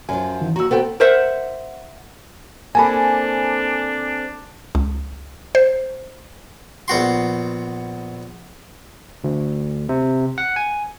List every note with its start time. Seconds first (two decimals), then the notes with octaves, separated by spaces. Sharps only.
0.09 F#2 F3 G#5
0.41 D#3 E3
0.56 D#2 F#4 A#5 E6
0.71 A#3 B3 F#4 A4 C5 G5
1.00 A#4 C5 E5 F#5
2.75 A#3 C4 D4 A4 G#5 A5 B5
4.75 C#2
5.55 C5
6.88 A#1 B3 F#4 C6
9.24 D2
9.89 C3
10.38 F#5
10.56 G#5